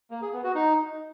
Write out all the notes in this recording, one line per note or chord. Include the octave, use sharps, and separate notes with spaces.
A#3
G#4
B3
F#4
D#4